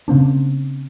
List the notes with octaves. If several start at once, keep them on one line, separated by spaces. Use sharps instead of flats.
C#3 A#3 C4 D4